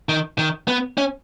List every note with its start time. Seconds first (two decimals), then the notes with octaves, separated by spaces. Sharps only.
0.09 D#3
0.38 D#3
0.68 B3
0.98 C#4